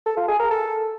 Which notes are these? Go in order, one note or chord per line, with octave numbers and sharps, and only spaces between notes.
A4
F4
G#4
A#4
A4